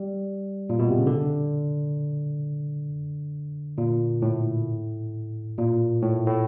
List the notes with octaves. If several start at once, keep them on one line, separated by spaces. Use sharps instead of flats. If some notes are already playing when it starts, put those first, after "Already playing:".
Already playing: G3
A#2
B2
C3
C#3
D3
A#2
A2
A#2
A2
A2